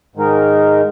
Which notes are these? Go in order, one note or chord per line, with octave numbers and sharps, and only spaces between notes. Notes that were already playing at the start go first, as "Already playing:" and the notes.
G#2 D#3 G#3 D#4 A#4